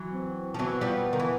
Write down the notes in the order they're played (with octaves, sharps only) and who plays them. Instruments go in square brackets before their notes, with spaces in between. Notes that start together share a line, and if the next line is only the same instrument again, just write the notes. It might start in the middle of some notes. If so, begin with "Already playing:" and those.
Already playing: [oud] E3 F#3
[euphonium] C4
[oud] F3
[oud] E3 F#3 [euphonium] B3
[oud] F3 G3
D#3
E3